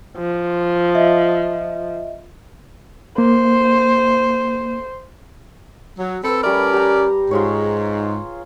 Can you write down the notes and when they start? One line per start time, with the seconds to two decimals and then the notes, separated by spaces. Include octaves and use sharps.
0.18 F3
0.95 D#5 E5
3.18 A#3 C5
5.98 F#3
6.23 C4 A4 B4 B5
6.43 G3 A3 C#4 A#4 D5
6.73 G4 A#5
7.31 G#2 F4 G#4 C#5